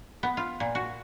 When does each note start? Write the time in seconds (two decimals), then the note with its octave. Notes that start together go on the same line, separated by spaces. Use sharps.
0.23 B3
0.37 F4
0.60 A#2
0.75 F#4